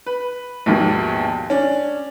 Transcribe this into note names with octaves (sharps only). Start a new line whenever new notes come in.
B4
A#1 D#2 G#2 B2
C#4 D4